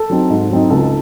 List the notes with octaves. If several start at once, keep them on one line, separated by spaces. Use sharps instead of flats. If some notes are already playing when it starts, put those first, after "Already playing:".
Already playing: A4
F#3 C4 D#4
G#2
F#3 C4 D#4
C#2 A4